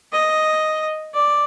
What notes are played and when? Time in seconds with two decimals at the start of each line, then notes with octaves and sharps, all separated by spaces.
0.12 D#5
1.14 D5